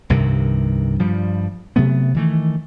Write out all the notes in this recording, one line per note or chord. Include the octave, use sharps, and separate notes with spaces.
C2 G2 C3 D#3
G2 F3 G3
C3 F#3 A3 B3
D#3 E3 A3